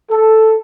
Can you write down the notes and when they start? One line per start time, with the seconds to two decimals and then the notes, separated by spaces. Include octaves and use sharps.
0.10 A4